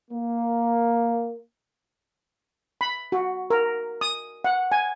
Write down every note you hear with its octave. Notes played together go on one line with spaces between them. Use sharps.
A#3
B5
F#4
A#4
D#6
F#5
G#5